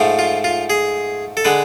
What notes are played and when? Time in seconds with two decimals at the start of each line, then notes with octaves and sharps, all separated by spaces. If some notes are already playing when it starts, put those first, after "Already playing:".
Already playing: G#2 F3 A3
0.19 F4
0.44 F4
0.70 G#4
1.37 A4
1.45 D3 G#3 B4